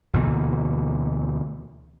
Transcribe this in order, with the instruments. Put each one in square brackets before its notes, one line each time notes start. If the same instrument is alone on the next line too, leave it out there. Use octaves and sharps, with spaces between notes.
[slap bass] D2 B2 E3 A#3